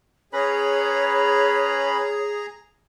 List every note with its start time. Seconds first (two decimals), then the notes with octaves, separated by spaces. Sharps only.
0.33 C#4 G#4 B4 C#5 A#5 B5